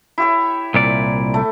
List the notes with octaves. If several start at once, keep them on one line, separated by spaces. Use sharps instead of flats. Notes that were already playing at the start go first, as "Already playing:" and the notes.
E4 G4 C#5
C2 A#2 D5
A3